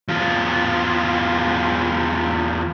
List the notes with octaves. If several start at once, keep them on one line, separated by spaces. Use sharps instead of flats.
E2 F4